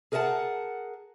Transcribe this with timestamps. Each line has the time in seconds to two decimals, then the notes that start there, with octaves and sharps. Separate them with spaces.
0.12 G#4 A#4 D#5 E5 F#5 A5